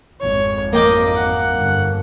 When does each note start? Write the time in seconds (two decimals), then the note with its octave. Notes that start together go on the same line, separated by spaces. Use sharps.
0.20 G#1 F2 C#5
0.73 A#3 D#5 G5 D6
1.15 F#5
1.55 G1